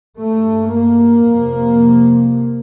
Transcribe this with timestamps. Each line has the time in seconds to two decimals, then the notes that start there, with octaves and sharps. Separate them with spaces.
0.19 G2 A3
0.73 A#3
1.27 F2 C3